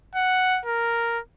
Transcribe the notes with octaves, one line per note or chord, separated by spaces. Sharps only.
F#5
A#4